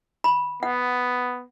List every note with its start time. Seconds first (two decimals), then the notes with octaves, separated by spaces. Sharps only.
0.24 B5
0.63 B3 F#5